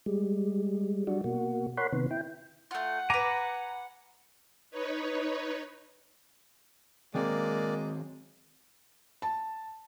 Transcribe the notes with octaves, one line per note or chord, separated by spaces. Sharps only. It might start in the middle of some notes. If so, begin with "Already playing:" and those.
G3 G#3
F#3 G3 D4 F#4
B2 A#3 F#4
A#4 C#5 F#5 B5 C6
C3 D#3 B3
E4 G5
A3 F4 F#5
B4 G#5 A#5 D6
D#4 B4 C#5
D#3 F#3 G#3 A#3 C4 D5
A5